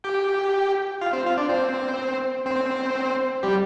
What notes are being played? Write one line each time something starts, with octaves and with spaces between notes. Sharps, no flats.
G4 G5
F4 F5
C4 C5
F4 F5
D4 D5
C4 C5
C4 C5
G3 G4